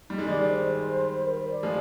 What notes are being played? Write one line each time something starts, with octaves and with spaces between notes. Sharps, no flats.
G3 D#4
G#3
D#3 G3 D5
C5
A#4
C5
D5
F3 G#3